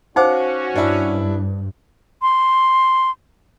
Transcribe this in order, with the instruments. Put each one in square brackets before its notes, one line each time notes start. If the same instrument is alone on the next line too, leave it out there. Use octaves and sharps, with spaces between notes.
[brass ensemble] C#4 F#4 [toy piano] D#4 C5 [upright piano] F5 F#5 D6
[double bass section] G2 [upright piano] D4 E4
[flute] C6